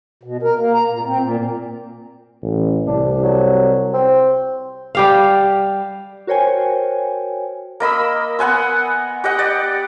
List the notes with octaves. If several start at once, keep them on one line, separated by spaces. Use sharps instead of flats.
B2
A#4
A#3
A#5
A#2
C4
A#2
A1
C2 D4
F#3
C4
G3 G4 F5
F#4 A#4 C5 C#5 G5 G#5
A#3 D#5 B5 E6
B3 F#5 G#5 C6
G4 D#5 F#5
D5